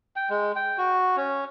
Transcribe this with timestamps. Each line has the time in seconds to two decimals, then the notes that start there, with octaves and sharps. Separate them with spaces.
0.16 G5
0.30 G#3
0.56 G5
0.78 F#4
1.16 C#4